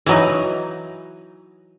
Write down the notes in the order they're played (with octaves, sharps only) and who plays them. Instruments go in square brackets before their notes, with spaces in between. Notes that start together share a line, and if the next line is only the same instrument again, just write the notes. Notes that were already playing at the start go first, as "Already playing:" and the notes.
[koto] E3 F#3 D#4